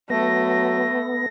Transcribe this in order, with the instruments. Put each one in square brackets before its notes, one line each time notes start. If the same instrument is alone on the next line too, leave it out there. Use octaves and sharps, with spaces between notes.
[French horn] F#3 [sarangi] A3 [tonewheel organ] B3 [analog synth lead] A#6